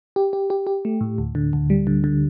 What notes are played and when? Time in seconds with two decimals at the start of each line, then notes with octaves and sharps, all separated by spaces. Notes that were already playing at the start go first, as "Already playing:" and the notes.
0.16 G4
0.33 G4
0.50 G4
0.67 G4
0.85 A3
1.01 A2
1.18 D2
1.35 D3
1.53 D2
1.70 G3
1.87 D3
2.04 D3